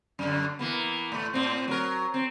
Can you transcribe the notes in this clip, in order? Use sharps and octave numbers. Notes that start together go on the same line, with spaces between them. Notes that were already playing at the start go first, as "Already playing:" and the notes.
F#2 D3
E3 A#3 B3
A2 A3
A2 C4
F#3 A#4
C4